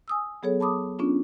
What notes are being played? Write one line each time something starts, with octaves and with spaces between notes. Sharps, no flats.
G#5 D#6 E6
F#3 B3 G#4 A4 C#5
A5 B5 D6 D#6
B3 C#4 D4 F4